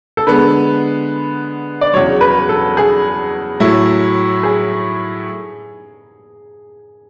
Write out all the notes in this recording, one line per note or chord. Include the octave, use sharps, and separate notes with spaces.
A4
D3 G#3 B3 B4
D5
E2 C#3 F#3 C#5
B4
A4
G#4
A2 F#3 A3 E4
G#4